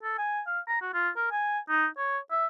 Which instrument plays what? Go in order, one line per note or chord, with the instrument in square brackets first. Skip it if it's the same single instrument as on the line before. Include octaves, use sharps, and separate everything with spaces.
[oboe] A4
G#5
F5
A#5
F#4
F4
A#4
G#5
D#4
C#5
E5